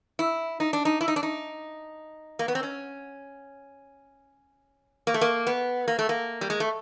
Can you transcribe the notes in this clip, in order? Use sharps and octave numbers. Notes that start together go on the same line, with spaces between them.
E4
D#4
D4
D#4
E4
D#4
D4
D#4
A#3
B3
C4
C#4
A#3
A3
A#3
B3
A#3
A3
A#3
G3
G#3
A3